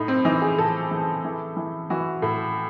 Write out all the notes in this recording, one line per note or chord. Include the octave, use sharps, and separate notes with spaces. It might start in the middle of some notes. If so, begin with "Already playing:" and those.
Already playing: A2 D#4
C4
E3 D#4
G#4
A2 A4
E3
E3
E3
E3 F#4
A2